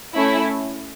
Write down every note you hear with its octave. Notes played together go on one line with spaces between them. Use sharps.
A3 C#4 E4